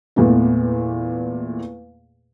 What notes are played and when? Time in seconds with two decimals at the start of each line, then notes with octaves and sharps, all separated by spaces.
0.16 E2 A#2 A3 B3